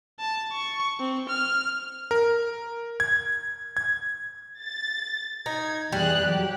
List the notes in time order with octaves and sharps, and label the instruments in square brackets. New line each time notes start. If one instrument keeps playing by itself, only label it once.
[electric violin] A5
C#6
C4
F6
[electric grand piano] A#4
G#6
G#6
[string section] A6
[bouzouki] D#4 [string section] G#6
[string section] E2 G#4 F#6 [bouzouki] G3
[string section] F#3 G4